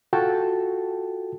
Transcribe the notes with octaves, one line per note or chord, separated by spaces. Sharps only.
F4 F#4 A4 G5 A5